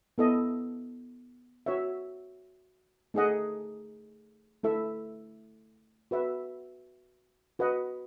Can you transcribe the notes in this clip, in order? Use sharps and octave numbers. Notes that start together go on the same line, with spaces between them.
B3 E4 A4 D#5
F#4 C#5 E5
A3 D#4 G#4 D#5 F#5
A3 E4 A4 E5
F#4 B4 E5
F#4 B4 D#5 F#5